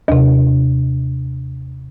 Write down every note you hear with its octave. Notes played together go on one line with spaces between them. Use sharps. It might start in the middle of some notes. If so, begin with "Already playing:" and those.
D#2 C3